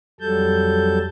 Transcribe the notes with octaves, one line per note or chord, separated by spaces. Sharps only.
F2 F#3 G3 A4 A5 G6